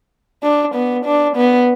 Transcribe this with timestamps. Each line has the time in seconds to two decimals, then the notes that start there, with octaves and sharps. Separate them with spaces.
0.43 D4
0.74 B3
1.05 D4
1.36 B3